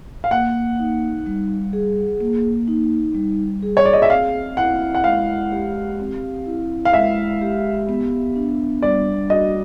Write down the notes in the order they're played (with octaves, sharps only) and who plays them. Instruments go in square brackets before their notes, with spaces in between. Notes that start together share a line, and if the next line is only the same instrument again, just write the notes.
[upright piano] F5
[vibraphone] A#3 [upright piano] F#5
[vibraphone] D#4
G3
G#4
A#3
D#4
G3
G#4
[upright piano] C#5
D5
D#5
E5
[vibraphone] C4 [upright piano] F5
[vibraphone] E4 [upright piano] F#5
[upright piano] F#5
[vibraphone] G#3 [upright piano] F5
[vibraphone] G4
C4
E4
[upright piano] F5
[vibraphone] G#3 [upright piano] E5
[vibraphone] G4
B3
D4
[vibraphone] G3 [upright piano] D5
[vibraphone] F#4 [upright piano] D#5